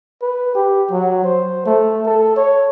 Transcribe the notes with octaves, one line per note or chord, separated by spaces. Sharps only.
B4
G4
F#3
C5
A3
A4
C#5